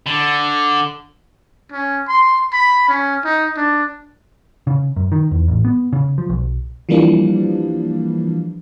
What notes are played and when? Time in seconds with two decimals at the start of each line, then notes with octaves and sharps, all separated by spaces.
0.06 D3
1.72 C#4
2.08 C6
2.53 B5
2.89 C#4
3.25 D#4
3.57 D4
4.67 C#3
4.96 F#2
5.12 D#3
5.31 E2
5.48 A1
5.65 B3
5.93 C#3
6.18 F3
6.30 B1
6.89 E3 F3 G3 A#3 D4